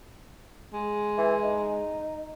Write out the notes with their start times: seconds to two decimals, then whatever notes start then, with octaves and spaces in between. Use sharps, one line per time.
0.73 G#3
1.18 E3
1.43 D#4